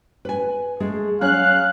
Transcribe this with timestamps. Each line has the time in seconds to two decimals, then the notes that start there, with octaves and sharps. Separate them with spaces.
0.25 B4 G#5
0.80 G#3 A3 G#4
1.21 F#3 C#4 C#5 F5 F#6